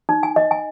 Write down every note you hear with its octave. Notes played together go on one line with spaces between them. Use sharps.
D#4
G#5
D#5
G#5